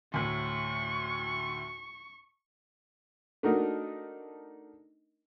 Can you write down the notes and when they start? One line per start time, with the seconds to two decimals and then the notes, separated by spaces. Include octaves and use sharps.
0.14 D2 A2 C#6
3.43 A3 D4 D#4 F#4 A#4 D#5